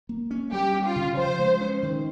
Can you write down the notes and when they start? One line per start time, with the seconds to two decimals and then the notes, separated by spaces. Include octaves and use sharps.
0.09 A#3
0.31 C#4
0.52 G3 G4
0.74 C#4
0.85 F4
0.96 C#3
1.18 F3 C5
1.39 G#3
1.61 C#4
1.83 D#3